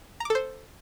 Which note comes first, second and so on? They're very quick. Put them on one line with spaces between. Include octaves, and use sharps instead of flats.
A#5 D6 A4 C5